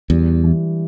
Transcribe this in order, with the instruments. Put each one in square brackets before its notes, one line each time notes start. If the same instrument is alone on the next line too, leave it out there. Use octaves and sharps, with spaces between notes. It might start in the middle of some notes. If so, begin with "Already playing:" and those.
[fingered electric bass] E2 [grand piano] G3
[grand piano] E3